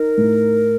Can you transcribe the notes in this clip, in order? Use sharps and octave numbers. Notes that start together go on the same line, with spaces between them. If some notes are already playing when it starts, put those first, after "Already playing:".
Already playing: D#4 A#4
A2